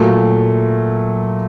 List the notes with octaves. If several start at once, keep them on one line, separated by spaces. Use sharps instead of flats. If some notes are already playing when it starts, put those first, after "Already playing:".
Already playing: A#2 F#3 A3